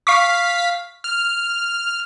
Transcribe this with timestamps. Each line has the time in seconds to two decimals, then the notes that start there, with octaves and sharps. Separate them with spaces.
0.07 F5 C#6 B6 C7
1.04 F6